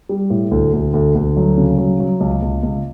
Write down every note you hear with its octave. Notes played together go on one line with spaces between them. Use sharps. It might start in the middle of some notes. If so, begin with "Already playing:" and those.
G3
A2
D2
D2
D2
D2
F#3
C#3
F#3
F#3
C#2
C#2
C#2